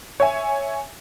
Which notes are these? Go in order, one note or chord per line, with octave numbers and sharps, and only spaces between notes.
C#5 E5 G#5